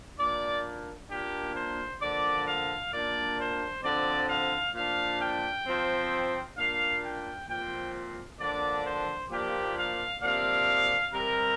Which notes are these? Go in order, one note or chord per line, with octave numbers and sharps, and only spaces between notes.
A#2 A#3 D4 D5
A#2 A#3 D4 G4
C5
D3 F3 A#3 D5
F5
A#2 A#3 D4 D5
C5
D3 F3 C4 D5
F5
A#2 F3 D4 F5
G5
F3 C4
A#2 A#3 D4 F5
G5
A#2 F3 C4 G5
D3 F3 A#3 D4 D5
C5
A#2 F3 A#3 D4 G4
F5
C3 F3 A#3 D4 F5
C3 G3 C4 A#4